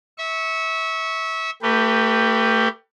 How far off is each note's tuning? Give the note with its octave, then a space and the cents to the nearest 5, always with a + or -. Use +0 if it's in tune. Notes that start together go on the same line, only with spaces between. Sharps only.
E5 -25 C#6 +0
A3 +35 G4 +0 B4 +0